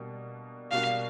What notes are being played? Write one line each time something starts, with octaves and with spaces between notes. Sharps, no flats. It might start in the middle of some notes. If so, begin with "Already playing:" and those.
Already playing: B2 G3 A#3 D4 F#4
B2 G3 A#3 D4 F#4 F5